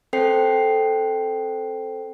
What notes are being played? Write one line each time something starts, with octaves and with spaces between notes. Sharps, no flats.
C4 A4 C5 G5 C7